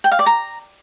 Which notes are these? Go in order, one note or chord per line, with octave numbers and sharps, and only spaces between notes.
G5
F5
D5
A#5